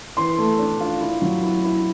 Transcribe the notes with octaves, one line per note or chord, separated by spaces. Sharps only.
E3 C6
A3
D4
F4
E4
F#3
E4
E4